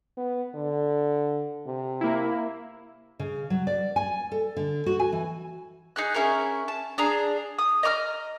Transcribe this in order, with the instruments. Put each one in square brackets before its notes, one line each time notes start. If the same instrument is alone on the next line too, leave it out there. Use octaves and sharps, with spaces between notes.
[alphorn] B3
D3
C3
[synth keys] A#3 E4
[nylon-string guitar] C#3
F#3
D5
G#5
A4
D3
F#4
G#5
E3
[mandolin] D#4 G#4 F#6
C#4 E4 G#4 A#4
A5
D4 G#4 A#5
D#6
D#5 A#5 D6 F6